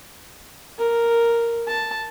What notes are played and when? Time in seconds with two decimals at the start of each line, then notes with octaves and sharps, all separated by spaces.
0.78 A#4
1.68 A5